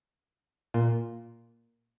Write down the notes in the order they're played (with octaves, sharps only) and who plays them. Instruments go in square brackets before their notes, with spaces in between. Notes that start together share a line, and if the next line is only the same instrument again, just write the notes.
[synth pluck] A#2